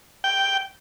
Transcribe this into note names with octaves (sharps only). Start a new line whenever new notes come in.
G5